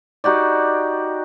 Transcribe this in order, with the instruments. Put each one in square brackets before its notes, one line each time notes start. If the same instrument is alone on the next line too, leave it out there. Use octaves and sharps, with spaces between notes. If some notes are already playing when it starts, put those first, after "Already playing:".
[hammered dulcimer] D#4 F#4 G4 D5